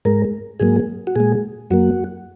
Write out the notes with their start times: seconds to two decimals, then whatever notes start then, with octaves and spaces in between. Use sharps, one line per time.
0.05 G#2 G#3 A#4
0.60 G#2 F#3 A#3 G#4
1.07 F#4
1.16 A#2 G#3 G#4
1.70 F#2 F#3 A#3 F#4